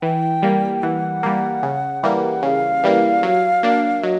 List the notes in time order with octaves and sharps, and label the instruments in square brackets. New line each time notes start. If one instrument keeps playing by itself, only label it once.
[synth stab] E3 [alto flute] G5
[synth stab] G3 A#3
[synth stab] E3 [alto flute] F#5
[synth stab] G3 A#3
C#3
E3 G3 A#3
[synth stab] C#3 [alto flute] F5
[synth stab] E3 G3 A#3
F#3
A#3 D4
[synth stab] F#3 [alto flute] D#5